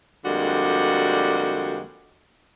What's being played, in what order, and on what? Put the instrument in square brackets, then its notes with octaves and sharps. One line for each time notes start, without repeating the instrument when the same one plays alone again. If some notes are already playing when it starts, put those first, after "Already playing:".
[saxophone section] F2 D3 G3 G#3 A#3 F#4